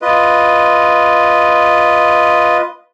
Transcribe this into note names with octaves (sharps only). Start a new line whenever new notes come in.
F4 B4 D#5